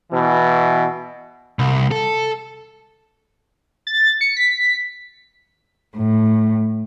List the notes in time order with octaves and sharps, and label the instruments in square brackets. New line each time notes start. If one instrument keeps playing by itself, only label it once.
[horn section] B2 E3
[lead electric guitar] C2
A4
[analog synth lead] A6
C#7
B6
[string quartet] A2